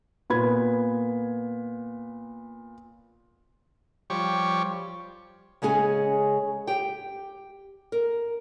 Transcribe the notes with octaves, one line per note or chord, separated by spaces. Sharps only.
A#2 B3 B5 G#6
F3 G3 G4 C#5 C#6
C#3 G#3 C#4 G#4 G#5
G4 G5
A#4